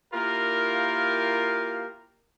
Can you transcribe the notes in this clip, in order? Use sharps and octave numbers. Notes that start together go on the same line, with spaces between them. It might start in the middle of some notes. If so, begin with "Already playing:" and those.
A#3 E4 F4 G4 A#4